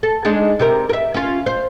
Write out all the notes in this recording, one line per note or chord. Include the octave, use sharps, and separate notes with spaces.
A4
G#3 D4 D#4
C3 G4 A#4
A#4 E5
C#4 F4
C5